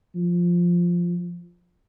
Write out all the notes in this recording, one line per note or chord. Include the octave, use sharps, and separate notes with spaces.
F3